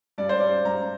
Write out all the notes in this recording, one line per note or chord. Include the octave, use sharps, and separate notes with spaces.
G2 D5
C5
G2 D5
G2 A#5